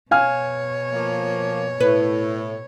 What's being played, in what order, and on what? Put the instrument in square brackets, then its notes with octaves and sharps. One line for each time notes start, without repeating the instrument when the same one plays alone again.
[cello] B2 C#5 [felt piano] F5 G#5 F6
[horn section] F3 A#3
[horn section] A2 [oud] B4